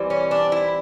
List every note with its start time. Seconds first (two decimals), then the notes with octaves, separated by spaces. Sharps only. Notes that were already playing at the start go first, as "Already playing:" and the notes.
Already playing: E3 G3 C4
0.10 C#4
0.31 D4
0.52 E4